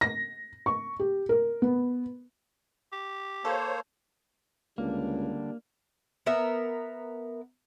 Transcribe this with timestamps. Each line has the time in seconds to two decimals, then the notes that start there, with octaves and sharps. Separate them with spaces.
0.01 A#6
0.66 C#6
0.99 G4
1.29 A#4
1.62 B3
2.92 G4
3.45 A#3 A4 C5 C#5
4.78 C#2 D3 G3 A#3 D4
6.26 B3 A#4 E5